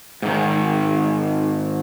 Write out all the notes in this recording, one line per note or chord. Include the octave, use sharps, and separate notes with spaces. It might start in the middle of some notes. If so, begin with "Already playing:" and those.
G#2 D#3